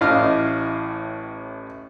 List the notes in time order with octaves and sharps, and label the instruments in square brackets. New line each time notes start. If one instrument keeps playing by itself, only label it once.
[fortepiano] A1 A2 D#5 F5 D6 F6